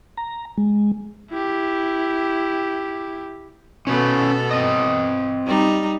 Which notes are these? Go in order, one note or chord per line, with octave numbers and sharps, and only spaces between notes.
A#5
G#3
E4 G4
B2 B3 C#4 A4 B4
C4 D#5
G3 D#4